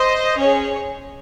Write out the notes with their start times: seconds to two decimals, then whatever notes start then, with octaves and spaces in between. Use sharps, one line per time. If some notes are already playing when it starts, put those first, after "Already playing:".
Already playing: C5 D#5
0.39 C#4 G#4 C#5